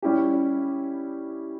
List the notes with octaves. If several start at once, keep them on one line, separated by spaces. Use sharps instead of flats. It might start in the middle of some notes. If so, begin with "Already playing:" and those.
G3 C#4 E4 G4